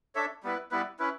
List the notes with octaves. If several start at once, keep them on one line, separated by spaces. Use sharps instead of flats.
D4 A4 C#5 E5
G3 B3 E4 B4
G3 B3 E4 B4
C#4 E4 B4